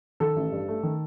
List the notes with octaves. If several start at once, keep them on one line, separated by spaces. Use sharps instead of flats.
D#3 A4
A1
G2
A3
D#3